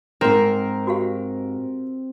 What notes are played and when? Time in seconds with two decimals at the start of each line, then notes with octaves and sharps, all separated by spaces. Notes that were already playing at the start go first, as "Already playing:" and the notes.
0.21 G#2 C4 D#4 A#4
0.87 F#4 G4 F5